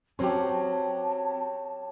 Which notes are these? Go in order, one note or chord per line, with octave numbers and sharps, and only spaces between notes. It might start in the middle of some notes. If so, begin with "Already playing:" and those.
F#3 C4 C#4 G4 C#5 A5